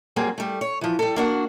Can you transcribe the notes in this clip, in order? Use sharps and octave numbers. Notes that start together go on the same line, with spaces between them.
F#3 G3 A#3 C4 G#4
G3 A3
C#5
E3 F3
G3 A4
A#3 D4 F#4